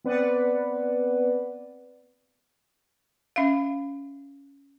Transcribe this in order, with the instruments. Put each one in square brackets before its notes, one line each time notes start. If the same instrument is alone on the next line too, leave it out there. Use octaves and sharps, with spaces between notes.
[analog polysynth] B3 C4 B4 D5 F#5
[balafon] C#4 E5 F5